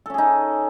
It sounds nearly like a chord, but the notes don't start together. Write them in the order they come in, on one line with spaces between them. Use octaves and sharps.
A4 C#4 G#4 D#4